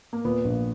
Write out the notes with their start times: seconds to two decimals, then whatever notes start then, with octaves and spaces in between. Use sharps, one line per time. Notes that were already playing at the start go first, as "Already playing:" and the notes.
0.13 A#3
0.25 A#2 B3
0.45 A#1